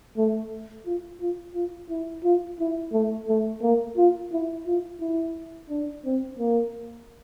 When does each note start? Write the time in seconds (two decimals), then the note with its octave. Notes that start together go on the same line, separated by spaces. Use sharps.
0.17 A3
0.86 F4
1.21 F4
1.55 F4
1.90 E4
2.24 F4
2.59 E4
2.93 A3
3.29 A3
3.63 A#3
3.97 F4
4.32 E4
4.67 F4
5.01 E4
5.70 D4
6.05 C4
6.39 A#3